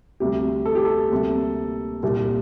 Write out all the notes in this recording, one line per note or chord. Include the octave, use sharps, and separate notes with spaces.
D2 C3 G3 G4
A4
G4
A4
D2 C3 G3 A#3
C2 A#2 G3